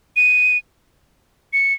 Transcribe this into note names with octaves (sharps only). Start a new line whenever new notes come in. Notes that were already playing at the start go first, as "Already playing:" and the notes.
D#7
C#7